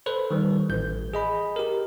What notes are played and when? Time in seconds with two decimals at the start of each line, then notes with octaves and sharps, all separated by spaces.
0.06 A4 B4 C5
0.31 D#3 G3
0.69 A1 G6
1.14 G#4 D#5 B5
1.56 G4 A#4